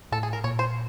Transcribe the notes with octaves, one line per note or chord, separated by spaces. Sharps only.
A2 A4
G#4
A#4
A#2 C#5
C5